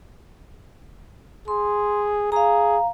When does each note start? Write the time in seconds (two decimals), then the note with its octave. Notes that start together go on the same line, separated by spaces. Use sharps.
1.48 G#4 C6
2.32 G#4 F5 A#5